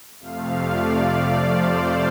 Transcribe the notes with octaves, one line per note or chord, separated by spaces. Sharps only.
F2 C3 F3 A3 F5
D5
D5
C5